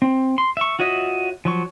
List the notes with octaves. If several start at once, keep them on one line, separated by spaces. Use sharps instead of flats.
C4
C6
E5 C#6
F4 F#4 C#5 D#5 E5
F3 F#3 C#6